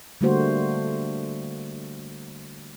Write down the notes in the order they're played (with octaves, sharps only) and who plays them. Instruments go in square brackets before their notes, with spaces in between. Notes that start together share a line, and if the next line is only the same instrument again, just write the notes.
[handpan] D3 G3 A3 A#3 F#4 C5